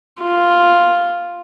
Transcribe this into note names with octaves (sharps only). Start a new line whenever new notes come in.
F4